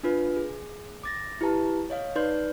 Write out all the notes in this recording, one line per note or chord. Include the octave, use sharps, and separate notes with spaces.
D4 F4 B4
G#4
D6 A6 A#6
E4 G4 B4 A5 A#5
C#5 D#5 F5
D#4 B4 D5 C6 G6